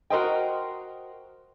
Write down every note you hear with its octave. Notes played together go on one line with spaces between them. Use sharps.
F#4 A#4 C5 D#5 G5